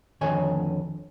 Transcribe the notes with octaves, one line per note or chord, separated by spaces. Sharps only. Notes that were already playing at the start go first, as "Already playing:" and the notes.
F2 D3 D#3 C#5 G#5